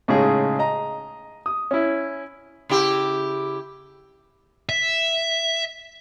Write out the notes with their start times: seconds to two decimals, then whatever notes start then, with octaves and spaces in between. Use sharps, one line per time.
0.08 A2 C#3 G#3 D#4 G#4
0.59 D#5 A#5
1.46 D#6
1.71 C#4 E4
2.70 C#3 E4 G4
4.69 E5